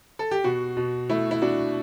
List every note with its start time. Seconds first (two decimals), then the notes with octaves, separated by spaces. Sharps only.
0.19 A4
0.31 G4
0.44 B2 F#4
0.77 B2
1.09 A3 E4
1.31 E4
1.42 D4 F#4